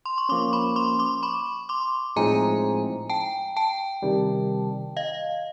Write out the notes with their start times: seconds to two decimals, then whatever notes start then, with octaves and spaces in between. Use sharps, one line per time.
0.06 C6
0.18 C#6
0.29 F3 A#3 C#4 C6 D6
0.53 B5 C#6
0.76 C6 D6
0.99 C6 D6
1.23 B5 C#6
1.69 C6 D6
2.16 A2 F3 G#3 C4 D#4 G#5 A#5
3.09 G5 A5
3.56 G5 A5
4.02 C3 D#3 G3
4.97 D#5 F5